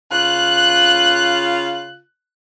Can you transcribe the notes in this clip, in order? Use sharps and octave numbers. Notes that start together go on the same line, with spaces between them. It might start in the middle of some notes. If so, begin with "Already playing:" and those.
C#3 F4 F#6